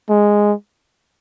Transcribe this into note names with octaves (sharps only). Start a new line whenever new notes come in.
G#3